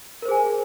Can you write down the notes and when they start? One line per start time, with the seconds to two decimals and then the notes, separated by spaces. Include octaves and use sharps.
0.22 A#4
0.25 C5
0.28 G#4
0.31 G#5